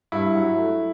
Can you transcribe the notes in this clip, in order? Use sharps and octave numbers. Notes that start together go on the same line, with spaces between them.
G2 E4
F#3
A3